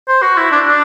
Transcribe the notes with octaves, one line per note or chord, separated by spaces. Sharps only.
C5
F#4
E4
D4
D4